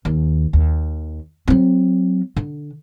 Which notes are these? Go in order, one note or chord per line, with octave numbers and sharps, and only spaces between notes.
D#2
D#2
F#3 C4
D3